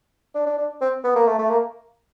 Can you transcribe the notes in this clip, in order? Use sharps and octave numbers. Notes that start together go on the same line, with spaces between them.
D4
D4
D4
C4
B3
A#3
A3
A3
A#3